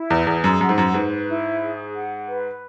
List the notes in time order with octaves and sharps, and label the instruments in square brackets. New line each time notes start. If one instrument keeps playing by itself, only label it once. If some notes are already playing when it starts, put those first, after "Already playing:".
Already playing: [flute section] E4
[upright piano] E2
[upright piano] E2 [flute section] G#4
[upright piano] F#2
[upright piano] F#2 [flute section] F#5
[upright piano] G#2
F#2
[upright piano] G#2 [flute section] B4
[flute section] E4
G#4
F#5
B4